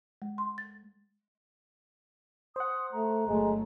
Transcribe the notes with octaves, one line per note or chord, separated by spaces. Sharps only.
G#3
C6
A6
C5 F#5 D#6
A3 A#5
G1 F#3 G#3 A3